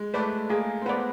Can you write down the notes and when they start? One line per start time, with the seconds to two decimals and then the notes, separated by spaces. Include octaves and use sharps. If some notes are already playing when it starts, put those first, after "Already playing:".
Already playing: G#3
0.14 A3 B4 D5
0.50 A#3 G#4
0.82 C4
0.86 B3 B4 D5